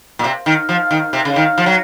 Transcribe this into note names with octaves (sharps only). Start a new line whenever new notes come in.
A#2
C3
D#3
F3
D#3
C3
C#3
D#3
F3
F#3